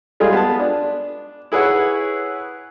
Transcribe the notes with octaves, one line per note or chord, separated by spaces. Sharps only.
G3 G#3 F4 G#4
B3 A5
D4
E4 G#4 B4 C#5 F#5